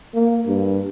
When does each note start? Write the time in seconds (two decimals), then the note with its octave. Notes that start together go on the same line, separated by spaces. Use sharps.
0.15 A#3
0.47 G2